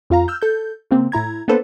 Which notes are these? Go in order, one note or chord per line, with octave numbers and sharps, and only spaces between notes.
F2 F4 F5 A#5
E6 F6 G6
A4 G6
C#3 A#3 C4
A2 E4 A#5 G#6
A#3 B3 D4 A4 B4 C5